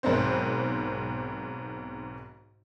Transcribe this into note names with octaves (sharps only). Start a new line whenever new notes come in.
B1 G#2 D#3 B3 C4 C5